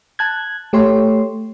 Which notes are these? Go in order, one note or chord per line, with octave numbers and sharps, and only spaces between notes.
A5 F#6 G#6
A3 G4 C#5 C6